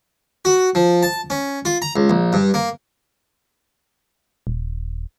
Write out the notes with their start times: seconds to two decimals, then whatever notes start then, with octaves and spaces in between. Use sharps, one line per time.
0.45 F#4
0.75 F3
1.03 A5
1.30 C#4
1.65 F4
1.82 A#5
1.96 C#2
2.10 A#1
2.33 G2
2.54 A#3
4.47 D#1